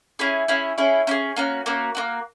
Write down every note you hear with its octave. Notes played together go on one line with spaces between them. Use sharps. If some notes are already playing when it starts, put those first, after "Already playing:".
C#4 E4 G#4
C#4 E4 G#4
C#4 E4 G#4
C#4 E4 G#4
A#3 C#4 F#4
A#3 C#4 F#4
A#3 C#4 F#4